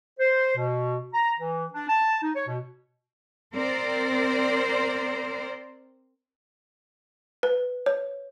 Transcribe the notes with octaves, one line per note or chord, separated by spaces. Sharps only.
C5
B2
A#5
E3
D4
A5
D#4
C#5
B2
C4 A#4 C5 D5
B4
C#5